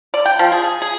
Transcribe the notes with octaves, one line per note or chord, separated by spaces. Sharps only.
D5
G5
F3
G#4
G#4
G#4